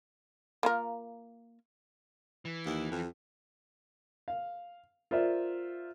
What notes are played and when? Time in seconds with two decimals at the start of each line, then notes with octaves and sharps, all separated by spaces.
0.63 A#3 F4 A#4
2.45 E3
2.66 D#2
2.91 F2
4.28 F5
5.11 F4 A#4 C5 D5 E5